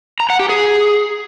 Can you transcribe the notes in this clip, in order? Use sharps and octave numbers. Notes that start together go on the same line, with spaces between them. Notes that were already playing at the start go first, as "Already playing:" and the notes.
A#5
F#5
G4
G#4